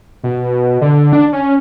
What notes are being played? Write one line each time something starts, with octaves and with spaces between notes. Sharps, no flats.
B2
D3
D4
C#4